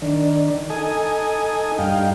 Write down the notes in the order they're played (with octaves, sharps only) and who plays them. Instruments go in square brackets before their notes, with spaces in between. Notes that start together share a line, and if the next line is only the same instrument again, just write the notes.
[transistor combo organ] D#3 D4
D#4 A4 G#5 D#6
G2 D#4 F5 G5